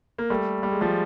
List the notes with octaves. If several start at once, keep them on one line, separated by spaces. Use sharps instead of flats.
A#3
G3 A3
G3
G#3
F3 G3